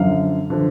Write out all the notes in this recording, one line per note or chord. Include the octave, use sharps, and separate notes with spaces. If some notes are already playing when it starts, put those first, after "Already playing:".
Already playing: F#2 D3 F3 F5
D3 F3